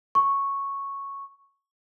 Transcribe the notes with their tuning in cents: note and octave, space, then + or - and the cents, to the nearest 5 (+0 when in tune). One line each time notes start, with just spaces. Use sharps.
C#6 -5